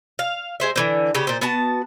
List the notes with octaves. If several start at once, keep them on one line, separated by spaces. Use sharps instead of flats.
F5
G#3 C5 E5
D3 E3 C4
C#3 B3 G4
A#2 C5
B3 F#4 A5